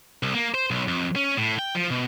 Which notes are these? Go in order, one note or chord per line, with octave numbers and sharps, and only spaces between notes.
C2
A#3
C5
B1
F2
C#4
A2
G5
F3
B2